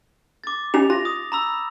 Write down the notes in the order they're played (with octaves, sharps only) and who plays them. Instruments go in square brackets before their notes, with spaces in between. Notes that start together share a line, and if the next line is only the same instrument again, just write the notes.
[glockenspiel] D6 A6
[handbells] C#4 D#4 G4 [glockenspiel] F7
[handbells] F4 [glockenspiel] A#6
[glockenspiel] D#6
A#5 B5 E6